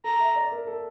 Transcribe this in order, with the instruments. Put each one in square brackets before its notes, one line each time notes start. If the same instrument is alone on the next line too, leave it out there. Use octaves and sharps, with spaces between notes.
[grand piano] A4 [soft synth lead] A#5
[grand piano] E5
D5
A#4
A4